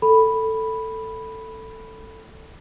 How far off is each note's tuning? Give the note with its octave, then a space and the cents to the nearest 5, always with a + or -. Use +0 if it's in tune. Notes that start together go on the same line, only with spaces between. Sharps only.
A4 +10 B5 +0